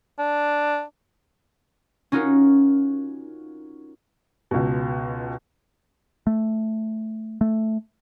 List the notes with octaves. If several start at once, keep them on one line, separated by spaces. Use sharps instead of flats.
D4
C#4 D#4 F4 F#4 A#4
C#2 B2
A3
A3